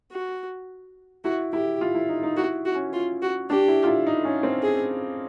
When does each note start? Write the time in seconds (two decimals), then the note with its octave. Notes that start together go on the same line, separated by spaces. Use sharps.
0.11 F#4
1.24 E4 F#4
1.53 E4 G4
1.81 F4
1.95 E4
2.09 D#4
2.23 D#4
2.37 E4 F#4
2.65 F#4
2.75 C#4
2.93 F4
3.22 F#4
3.50 D4 G4
3.68 E4
3.84 F4
3.87 E4
4.06 D#4
4.25 C#4
4.43 C4
4.63 G#4